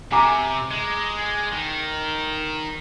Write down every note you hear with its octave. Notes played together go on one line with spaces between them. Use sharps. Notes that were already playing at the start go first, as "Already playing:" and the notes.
C3 G#5 A#5 D6
G#3
D#3